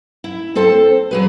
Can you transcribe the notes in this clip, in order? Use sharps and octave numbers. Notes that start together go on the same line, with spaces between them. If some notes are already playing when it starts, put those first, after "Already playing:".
E4
C4 A4 C5 A5
F#3 G#4 B4